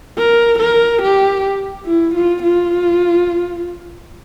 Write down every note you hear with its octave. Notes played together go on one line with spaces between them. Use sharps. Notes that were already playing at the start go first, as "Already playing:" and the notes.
A#4
A#4
G4
E4
F4
F4